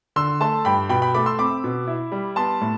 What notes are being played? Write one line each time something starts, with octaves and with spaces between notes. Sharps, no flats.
D3 C6 E6
A3 A5 C6
G2 G5 B5
B2 G5 B5
G5 B5
A3 B5 D6
C6 E6
C4 B5 D6
B2
E4
G3
B3 A5 C6
A2